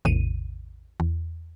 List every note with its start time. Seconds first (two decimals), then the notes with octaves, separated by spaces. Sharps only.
0.05 A1 E2 A2 C3 D#7
1.00 E2